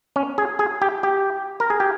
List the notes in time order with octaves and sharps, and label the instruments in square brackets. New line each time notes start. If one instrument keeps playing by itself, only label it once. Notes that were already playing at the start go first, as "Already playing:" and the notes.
[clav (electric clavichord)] C#4
G#4
G#4
G4
G4
A#4
G#4
G4